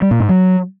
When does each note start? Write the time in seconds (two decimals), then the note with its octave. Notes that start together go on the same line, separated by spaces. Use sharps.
0.02 G3
0.11 A#2
0.20 G#2
0.29 F#3